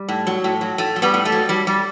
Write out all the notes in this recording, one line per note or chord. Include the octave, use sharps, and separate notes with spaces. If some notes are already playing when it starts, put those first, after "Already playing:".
Already playing: G3
A2
F#3
A2
F#3
A2 A3
F#3
G3 B3
A2
A3
F#3
F#3 G3
G3